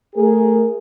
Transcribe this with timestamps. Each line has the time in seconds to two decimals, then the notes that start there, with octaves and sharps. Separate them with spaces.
0.15 A3 G#4 A#4